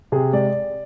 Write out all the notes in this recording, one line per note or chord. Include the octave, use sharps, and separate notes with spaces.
C3 G#4
G#3 D5